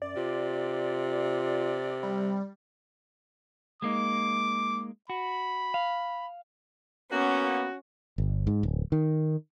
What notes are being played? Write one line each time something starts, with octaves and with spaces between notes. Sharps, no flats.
F#2 D5
C3 F4
G3
G#3 A#3 D#4 D6
F#4 B5
F5
A#3 B3 C#4 F#4
G1
G#2
D1
D#3